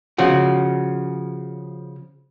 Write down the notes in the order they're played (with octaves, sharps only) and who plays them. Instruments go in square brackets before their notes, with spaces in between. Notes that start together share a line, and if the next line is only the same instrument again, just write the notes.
[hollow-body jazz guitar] C#3 F3 F#4